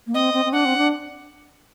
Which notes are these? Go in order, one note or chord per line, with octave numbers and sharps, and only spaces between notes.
A#3
C4 D#5
C4
C4
D4 F#5
C4
D4